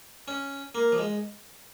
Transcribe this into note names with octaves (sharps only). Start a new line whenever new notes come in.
C#4
A#3
F3
G#3